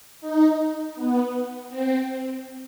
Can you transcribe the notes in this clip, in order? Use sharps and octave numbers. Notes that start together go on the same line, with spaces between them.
D#4
B3
C4